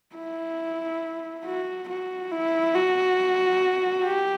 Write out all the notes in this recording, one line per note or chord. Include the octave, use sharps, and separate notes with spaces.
E4
F#4
F#4
E4
F#4
G4